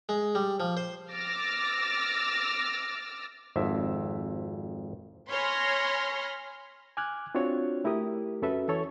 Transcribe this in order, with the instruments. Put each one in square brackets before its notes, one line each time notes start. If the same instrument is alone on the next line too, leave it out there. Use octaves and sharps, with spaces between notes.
[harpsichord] G#3
G3
F3
C5
[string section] D6 E6 F6 A6 A#6
[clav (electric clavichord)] G#1 F2 E5
[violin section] C#5 G#5 B5 C6 F6 A#6
[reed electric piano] G#5 D6 F6 F#6 G#6
C4 D4 F4 F#4 C#5
A3 E4 G4 A#4 D#6
F2 C#4 F#4 A4 B4 E5
E3 E4 A4 C#5 C#6